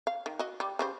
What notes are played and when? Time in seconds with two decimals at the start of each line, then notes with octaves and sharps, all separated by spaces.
0.07 F5
0.26 D#3
0.39 F#4 D#5
0.60 G3
0.79 C#3 G3 C5